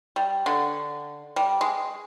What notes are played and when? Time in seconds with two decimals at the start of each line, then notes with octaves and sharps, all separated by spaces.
0.16 G3
0.46 D3
1.36 G3
1.61 G#3